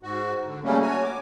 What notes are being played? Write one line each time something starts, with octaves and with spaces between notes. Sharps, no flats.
G#2 F#4
D3
C#3 F#3 G3 A3 A#3 C#4
F#4 C#5 G#5
D6